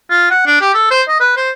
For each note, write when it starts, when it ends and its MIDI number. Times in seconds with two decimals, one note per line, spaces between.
0.10 0.30 65
0.31 0.44 78
0.46 0.56 62
0.61 0.70 67
0.74 0.90 69
0.91 1.02 72
1.08 1.17 75
1.20 1.34 71
1.37 1.50 72